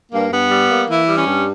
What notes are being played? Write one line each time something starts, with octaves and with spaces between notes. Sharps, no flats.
G2 A#3
G2 B3
G3
A#3
E3 E4
G3
C#4
G2